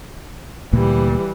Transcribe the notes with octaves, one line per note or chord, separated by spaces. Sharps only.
D2 A#2 E3 G3 A#3